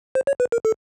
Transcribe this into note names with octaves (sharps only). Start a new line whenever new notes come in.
C5
C#5
B4
A#4
A4